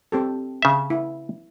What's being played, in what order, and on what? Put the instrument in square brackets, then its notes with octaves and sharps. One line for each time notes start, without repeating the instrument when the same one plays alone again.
[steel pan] C4 G4 A4
[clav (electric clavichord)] C#3 E5
[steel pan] E4